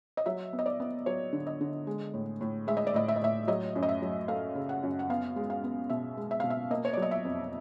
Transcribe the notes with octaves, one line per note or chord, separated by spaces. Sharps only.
D#5
F#3 E5
B3
D#5
D5
B3
F#3 C#5
D3
D#5
D3
G#3
A2
A2
G#3 E5
D#5
D5
A2 D#5
E5
D#5
A2 E5
F#3 D#5
F#2
D#5
E5
F#3
A3 F5
C#3
F#5
F#2
F#5
B3 F5
G#3
F5
B3
B2 E5
G#3
E5
B2 F5
E5
A#3 D#5
C#5
D5
F#3
D#5
E5
F2